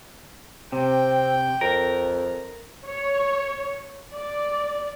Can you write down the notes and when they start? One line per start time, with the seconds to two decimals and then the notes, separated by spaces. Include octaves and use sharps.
0.72 C3 C4 G5
1.61 F2 A#4
2.85 C#5
4.13 D5